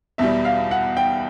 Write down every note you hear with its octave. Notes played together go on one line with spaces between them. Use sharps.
E2 B2 G3 E5
F5
F#5
G5